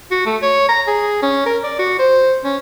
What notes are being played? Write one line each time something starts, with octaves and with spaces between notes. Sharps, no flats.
F#4
A3
C#5
A#5
G#4
C#4
A#4
D5
F#4
C5
C#4